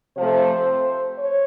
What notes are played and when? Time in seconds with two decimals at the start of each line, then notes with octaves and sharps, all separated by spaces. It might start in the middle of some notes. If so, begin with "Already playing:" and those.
0.16 C3 F3 A3 C5
1.16 C#5